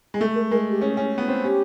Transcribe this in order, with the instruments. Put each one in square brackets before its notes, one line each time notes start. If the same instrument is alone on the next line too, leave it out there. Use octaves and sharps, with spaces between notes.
[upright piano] G#3
[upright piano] A3 [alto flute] A4
[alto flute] A#4
[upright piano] G#3 [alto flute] A#4
[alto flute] G4
[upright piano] C#4 [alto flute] G#4
[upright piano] C#4
B3
C4
[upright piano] C#4 [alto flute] G4